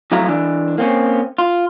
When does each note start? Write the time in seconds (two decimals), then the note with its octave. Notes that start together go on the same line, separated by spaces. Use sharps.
0.12 F2 A2 F#3 E4 F5 A#5
0.28 E3 D4
0.78 A#3 C4 C#4
1.38 F4